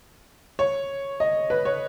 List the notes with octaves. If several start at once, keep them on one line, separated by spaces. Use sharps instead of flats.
C#5
D#5
B4
C#5